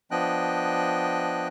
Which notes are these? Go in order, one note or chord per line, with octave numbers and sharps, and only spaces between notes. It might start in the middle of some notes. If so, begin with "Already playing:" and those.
F3 B3 D4 D#5 G5 F#6